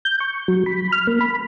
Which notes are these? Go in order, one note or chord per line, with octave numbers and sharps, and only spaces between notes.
G6
C#6
F#3
B5
F6
A#3
B5